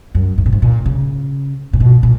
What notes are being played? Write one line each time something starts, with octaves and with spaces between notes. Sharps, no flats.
F#2
G#2
A#2
G#2
A#2
C#3
A#2
B2
A#2